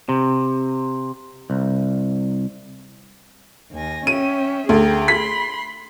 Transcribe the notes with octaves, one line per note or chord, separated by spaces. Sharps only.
C3
C2
D#2 G#5 A#6
C#4 E5 G5 D#7
D2 G#4 G5 A#5
B5 C6 B6